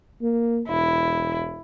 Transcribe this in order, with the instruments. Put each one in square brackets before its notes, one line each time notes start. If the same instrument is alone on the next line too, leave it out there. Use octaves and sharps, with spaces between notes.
[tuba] A#3
[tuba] E1 [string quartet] E4